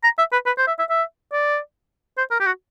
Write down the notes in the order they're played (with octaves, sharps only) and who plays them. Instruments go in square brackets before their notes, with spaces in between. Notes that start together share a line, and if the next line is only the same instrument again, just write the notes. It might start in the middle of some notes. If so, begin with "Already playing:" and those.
[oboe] A#5
E5
B4
B4
C5
E5
E5
E5
D5
C5
A#4
G4
F#4